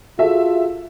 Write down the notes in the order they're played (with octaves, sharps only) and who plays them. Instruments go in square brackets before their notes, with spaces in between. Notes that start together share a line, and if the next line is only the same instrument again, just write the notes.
[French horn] F4 [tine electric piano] F#4 G#4 [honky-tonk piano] A4 E5